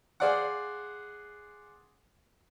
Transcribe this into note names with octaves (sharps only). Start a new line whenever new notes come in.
G#4 C5 D5 F5 F#5